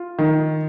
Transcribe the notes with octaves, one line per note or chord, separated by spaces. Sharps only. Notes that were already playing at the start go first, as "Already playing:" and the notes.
Already playing: F4
D#3